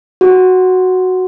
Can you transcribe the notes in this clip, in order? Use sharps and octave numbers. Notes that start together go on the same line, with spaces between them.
F#4